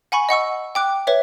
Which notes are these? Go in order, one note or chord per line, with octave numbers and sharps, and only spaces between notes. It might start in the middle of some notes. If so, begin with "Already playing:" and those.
F#5 G#5 B5 C#6
D#5 F#5 C#6 E6
G5 D6 F#6
B4 C#5 E5